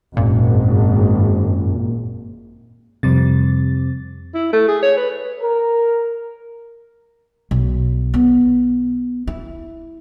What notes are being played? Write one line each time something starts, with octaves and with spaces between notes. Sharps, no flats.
G#1 F#2 A#2
F2 C3 G3 A6
E4
A3
G#4
C#5
B4
A#4
B1
B3
E4